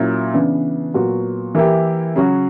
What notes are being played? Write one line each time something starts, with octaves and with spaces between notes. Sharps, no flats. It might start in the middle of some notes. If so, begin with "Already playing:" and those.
Already playing: A#2 F#3 C#4 E4
C#3 E3 B3 D4
A#2 F#3 B3 F#4
E3 A#3 E4 G4
C#3 F#3 C#4 F#4